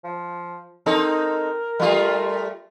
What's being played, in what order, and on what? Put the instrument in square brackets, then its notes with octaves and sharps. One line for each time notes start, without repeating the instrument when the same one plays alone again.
[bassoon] F3
[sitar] C4 D#4 A4 [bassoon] A#4
[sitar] G3 A3 F4